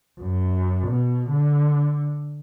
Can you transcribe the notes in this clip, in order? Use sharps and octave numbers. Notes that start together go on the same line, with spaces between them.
F#2
B2
D3